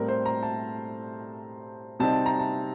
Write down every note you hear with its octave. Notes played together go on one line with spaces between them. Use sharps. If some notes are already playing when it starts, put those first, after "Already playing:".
Already playing: A2 G3 C4 A#4
C5
A#5
A5
C3 G3 C4 D#4 A5
A5
A#5
A5